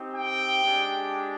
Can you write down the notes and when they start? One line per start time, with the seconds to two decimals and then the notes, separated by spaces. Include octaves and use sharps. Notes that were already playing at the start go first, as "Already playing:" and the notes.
Already playing: C4 D#4 G4
0.14 G5
0.64 G#3 D4 G4